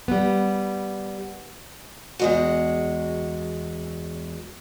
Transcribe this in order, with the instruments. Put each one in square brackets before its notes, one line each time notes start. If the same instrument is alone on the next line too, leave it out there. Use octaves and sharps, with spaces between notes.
[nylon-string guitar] G3 B3
[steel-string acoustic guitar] E2 G#3 F#4